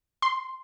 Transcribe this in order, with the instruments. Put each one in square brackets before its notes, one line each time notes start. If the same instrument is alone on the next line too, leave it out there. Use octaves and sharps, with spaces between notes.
[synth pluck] C6